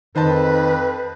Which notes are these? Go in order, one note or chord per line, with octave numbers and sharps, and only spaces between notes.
F2 D#3 B4 C5 D#5 A5